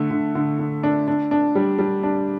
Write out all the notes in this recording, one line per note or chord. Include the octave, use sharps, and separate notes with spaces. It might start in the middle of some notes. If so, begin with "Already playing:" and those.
Already playing: D3 A3
D3
D3
D3
D4
D4
D4
G3
G3
D4